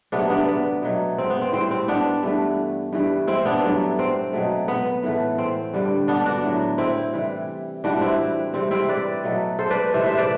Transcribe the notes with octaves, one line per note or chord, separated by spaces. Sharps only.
C3 F#3 A3 B3 D4
B3 D4
B3
B2 F#3 A3
C4
B3
C4
A2 G3 C4
C4
B3 D4
G2 E3 A3
G2 E3 G3
C4 E4
B3 D4
G2 F#3 A3
C4
B2 F#3 A3
B3
A2 E3 A3
C4
G2 D3 G3
B3 D4
D4 F#4
A2 F#3 A3
C4 E4
C3 E3 G3
A2 E3 G3 D4 F#4
C4 E4
C3 G3 C4
C4 E4
B4 D5
B2 F#3 A3
A4 C5
B4 D5
C3 E3 A3 C5 E5
C5 E5
B4 D5